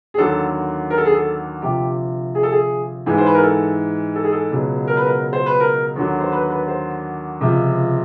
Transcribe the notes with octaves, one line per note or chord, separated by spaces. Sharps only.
G#4
D#2 D3 F#3 A4
A#4
A4
G#4
A4
D2 C3 F3 G4
G#4
A4
G#4
G#2 E3
C5
B4
A#4
A4
A4
G#4
A4
C#2 B2 F#3
A#4
B4
A#4
C5
B4
A#4
D#2 D3 F#3
C5
B4
B4
C5
C#2 C3 F3